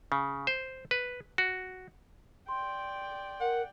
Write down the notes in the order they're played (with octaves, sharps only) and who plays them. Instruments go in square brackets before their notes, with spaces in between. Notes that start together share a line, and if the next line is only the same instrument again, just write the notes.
[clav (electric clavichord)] C#3
C5
B4
F#4
[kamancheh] D5 G5 [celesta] C6
[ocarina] A#4 [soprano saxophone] F#5